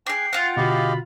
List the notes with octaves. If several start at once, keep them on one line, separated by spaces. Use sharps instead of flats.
D4 G#4 G5 C7
F4 F#5
B2 D3 F#4 G4 D#5 F5 B5